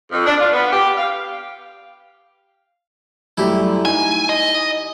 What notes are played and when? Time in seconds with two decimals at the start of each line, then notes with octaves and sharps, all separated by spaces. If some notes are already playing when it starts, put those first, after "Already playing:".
0.12 F2
0.26 D4
0.40 F4
0.53 B3
0.73 G4
0.98 F5
3.38 F#2 G3 A3 E4 G4
3.85 D#4 G#5
4.29 D#5